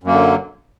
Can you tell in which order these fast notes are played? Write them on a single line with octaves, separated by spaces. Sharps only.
F#2 A#3 D3 F#3